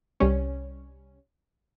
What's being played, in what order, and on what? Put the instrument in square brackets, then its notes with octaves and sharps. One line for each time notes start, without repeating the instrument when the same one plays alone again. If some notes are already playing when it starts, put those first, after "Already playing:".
[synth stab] C2 G3 C#4